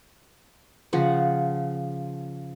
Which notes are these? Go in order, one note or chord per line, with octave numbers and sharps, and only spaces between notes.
C#3 F3 F#5